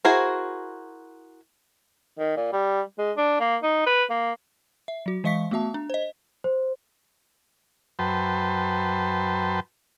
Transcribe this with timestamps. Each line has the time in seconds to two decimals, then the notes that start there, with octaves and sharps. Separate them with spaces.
0.05 E4 F#4 G#4 A#4 C5
2.19 D#3
2.37 A#2
2.53 G3
2.99 G#3
3.17 D4
3.40 A#3
3.63 D#4
3.86 B4
4.10 A#3
4.88 E5
5.06 F#3 F#4
5.24 E3 G#3 D#5 F5 C#6 B6
5.51 A3 B3 F#4 E5 A5
5.74 D4
5.90 C5 D#5
6.44 C5
7.99 F#2 B4 C5 G5 A5